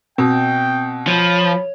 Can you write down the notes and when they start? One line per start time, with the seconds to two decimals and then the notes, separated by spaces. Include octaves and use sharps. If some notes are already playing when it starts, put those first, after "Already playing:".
0.18 B2 C4 G5
1.07 F3 C#5 B5